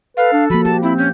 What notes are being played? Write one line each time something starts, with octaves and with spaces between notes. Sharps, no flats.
A4 B4 F5
D4
F3 A#3 F#4 B5
G4 A5
C4 E4 B5
C#4 G6